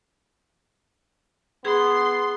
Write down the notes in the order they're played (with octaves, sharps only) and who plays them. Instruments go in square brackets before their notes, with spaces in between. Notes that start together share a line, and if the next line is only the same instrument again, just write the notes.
[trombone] B3 [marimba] G#4 [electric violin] C6